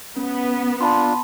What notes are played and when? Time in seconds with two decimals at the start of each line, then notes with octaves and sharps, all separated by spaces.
0.16 B3 C#4
0.81 D4 F4 A5 B5 C6